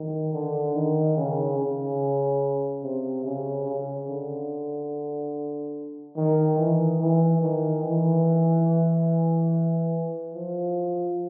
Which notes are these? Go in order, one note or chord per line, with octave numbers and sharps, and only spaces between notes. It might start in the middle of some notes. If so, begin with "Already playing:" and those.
Already playing: D#3
D3
D#3
C#3
C#3
C3
C#3
C#3
D3
D#3
E3
E3
D#3
E3
F3